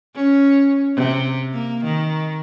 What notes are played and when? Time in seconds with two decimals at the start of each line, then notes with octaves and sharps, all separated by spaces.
0.16 C#4
0.96 C3
1.53 A#3
1.84 D#3